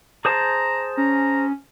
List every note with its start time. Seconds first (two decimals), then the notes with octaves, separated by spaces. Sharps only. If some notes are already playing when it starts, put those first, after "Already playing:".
0.25 G#4 C5 A5 A#5
0.97 C#4 A#5